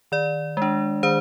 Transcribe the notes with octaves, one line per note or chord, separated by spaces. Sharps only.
D#3 D5
G#3 D4
D#3 C5